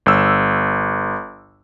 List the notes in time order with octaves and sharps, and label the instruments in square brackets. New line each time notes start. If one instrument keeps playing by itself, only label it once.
[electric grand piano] G1 E6